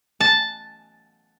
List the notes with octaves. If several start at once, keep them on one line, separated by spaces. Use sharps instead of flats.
A5